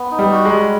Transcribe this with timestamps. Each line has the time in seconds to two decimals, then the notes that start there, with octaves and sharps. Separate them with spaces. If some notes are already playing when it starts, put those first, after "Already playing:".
Already playing: B3
0.11 D#4
0.19 G3
0.31 F#4
0.45 G#3
0.52 G3